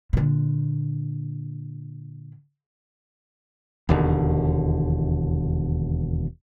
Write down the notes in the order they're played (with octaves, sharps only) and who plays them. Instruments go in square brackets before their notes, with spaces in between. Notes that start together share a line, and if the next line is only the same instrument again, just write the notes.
[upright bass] A#2 D3
[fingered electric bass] E1 D#2 D3